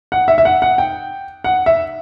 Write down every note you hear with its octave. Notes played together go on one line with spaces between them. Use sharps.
F#5
E5
E5
F#5
F#5
G5
F#5
E5